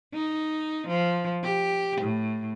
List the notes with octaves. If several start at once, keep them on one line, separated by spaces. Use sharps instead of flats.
D#4
F3
G4
A2